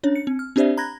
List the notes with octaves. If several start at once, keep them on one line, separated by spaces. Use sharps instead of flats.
C#4 D4 C#5
C#7
C4
F6
C4 D4 G4 C5 D5 E5
A#5 B5 F#6 G#6 A#6